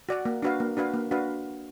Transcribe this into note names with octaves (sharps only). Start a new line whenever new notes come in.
F#4 D5 F#5
A#3
D4 F#4 B4 F5
A#3
D4 F#4 B4 F5
A#3
D4 F#4 B4 F5